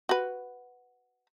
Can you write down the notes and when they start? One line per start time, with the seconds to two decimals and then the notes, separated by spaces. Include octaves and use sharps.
0.09 F#4 B4